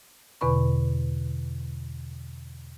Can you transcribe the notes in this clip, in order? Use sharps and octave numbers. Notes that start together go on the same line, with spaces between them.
E2 B2 D3 B4 B5 C#6